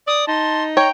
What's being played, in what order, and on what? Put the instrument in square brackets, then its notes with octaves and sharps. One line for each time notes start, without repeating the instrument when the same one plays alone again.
[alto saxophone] D5 [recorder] D#6
[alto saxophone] D#4 [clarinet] A5 [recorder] C6
[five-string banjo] C#5 [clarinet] G5 [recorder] A#5